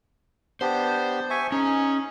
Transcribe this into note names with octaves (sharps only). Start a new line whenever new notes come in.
B3 D4 G4 C5
E5 G#5 C#6
C#4 D#4 G#4